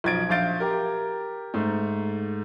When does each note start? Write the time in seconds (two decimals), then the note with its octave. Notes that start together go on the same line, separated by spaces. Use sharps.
0.04 B1 F3 D#5 G#6 A6 D7
0.29 A#1 E5 F5 G6 A6 D7
0.60 G4 A#4
1.54 G#2 A3